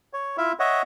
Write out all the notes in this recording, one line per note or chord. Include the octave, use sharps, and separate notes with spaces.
C#5
E4 F4 E5
C#5 D#5 E5 F#5